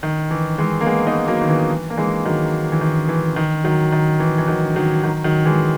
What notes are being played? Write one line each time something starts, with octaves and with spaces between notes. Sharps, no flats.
D#3
E3
E3 G#3
A#3
G#3 B3
B3 D#4
F#3 A#3
D#3
E3
E3
A#3
E3 G#3
D#3 F#3
E3
D#3
E3
D#3
D#3 F#3
D#3
E3
E3
D#3 F#3
D#3 F#3
D#3 F#3
D#3 F#3
E3 G#3